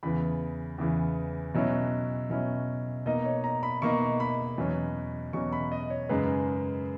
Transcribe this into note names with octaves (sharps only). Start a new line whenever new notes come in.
E2 C#3 E3 B3 B5
E2 C#3 E3 B3
B2 F#3 C#4 E4
B2 F#3 C#4 E4
B2 A#3 D#4 D#5
C#5
A#5
B5
B2 A#3 D#4 C#6
B5
E2 B2 F#3 C#4
E2 B2 F#3 C#4 C#6
B5
D#5
C#5
F#2 C#3 G#3 D#4 B4